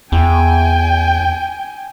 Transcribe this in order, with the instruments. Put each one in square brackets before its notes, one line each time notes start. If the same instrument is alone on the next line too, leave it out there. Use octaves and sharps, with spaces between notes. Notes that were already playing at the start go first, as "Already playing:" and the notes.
[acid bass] E2 [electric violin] G5 G#5